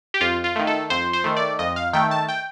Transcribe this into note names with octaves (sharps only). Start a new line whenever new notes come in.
G4
F2 F4
F4
D#3 A3
A4
F2 C5
C5
D#3 A3
D5
F2 D#5
F5
D#3 A3 G5
A5
G5